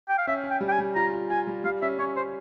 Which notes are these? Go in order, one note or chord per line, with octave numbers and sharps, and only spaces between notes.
G5
F5
C#4 E5
C#4
G5
G3
G5
G#5
G3
F4 A#5
F4
F4 G#5
G3
G3 F5
C#4 E5
C#4 C#5
C5